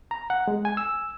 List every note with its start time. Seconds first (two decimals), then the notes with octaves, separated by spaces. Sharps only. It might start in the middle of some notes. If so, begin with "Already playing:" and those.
0.11 A#5
0.30 F#5
0.48 G#3
0.65 G#5
0.77 E6